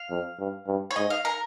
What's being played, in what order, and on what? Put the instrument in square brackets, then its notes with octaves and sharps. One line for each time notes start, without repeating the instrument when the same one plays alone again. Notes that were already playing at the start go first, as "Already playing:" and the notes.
Already playing: [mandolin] F5
[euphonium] F2
G2
G2
[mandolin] C#5
[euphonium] G#2 [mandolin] D#5
[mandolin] F5
A#4